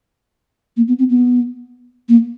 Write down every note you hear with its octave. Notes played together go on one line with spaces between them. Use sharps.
A#3
B3
C4
B3
A#3